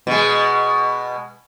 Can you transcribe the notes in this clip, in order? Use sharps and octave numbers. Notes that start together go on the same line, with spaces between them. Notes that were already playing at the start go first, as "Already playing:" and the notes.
B2 G#3